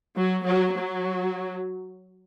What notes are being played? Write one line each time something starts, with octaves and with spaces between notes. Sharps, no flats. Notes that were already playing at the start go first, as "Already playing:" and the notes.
F#3
F#3
F#3